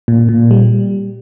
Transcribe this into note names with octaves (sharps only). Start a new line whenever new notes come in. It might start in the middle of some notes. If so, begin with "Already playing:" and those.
A#2
A#2
G3